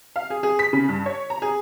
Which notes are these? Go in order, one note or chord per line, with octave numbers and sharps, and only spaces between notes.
F5
G#4
G#4
B6
C#3
G2
C#5
A#5
G#4